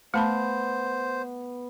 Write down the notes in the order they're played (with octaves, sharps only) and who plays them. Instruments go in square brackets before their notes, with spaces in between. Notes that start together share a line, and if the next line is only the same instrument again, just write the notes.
[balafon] A3 A5 B5 [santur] B3 [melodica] C5